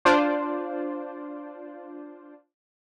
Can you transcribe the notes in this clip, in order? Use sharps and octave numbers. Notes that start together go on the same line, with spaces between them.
D4 F4 C5 D5